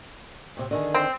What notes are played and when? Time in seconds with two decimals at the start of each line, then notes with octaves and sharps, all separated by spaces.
0.57 A2 C3
0.71 D3 D#3 G#4
0.94 C4